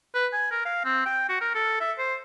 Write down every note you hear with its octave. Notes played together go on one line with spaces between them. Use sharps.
B4
G#5
A#4
F5
C4
G5
F#4
A#4
A4
E5
C5